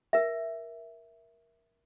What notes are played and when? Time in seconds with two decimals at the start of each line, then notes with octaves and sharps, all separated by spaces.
0.13 A#4 E5